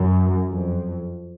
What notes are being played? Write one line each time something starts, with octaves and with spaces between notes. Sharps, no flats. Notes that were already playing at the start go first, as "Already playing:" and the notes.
Already playing: F#2
F2